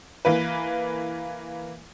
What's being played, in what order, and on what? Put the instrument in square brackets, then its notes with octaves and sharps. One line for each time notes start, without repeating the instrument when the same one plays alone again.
[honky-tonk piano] E3 A#3 B4